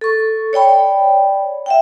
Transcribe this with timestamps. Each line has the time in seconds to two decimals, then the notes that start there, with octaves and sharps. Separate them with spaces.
0.01 A4 C#6
0.53 C#5 D5 G5 B5
1.66 E5 F#5 G5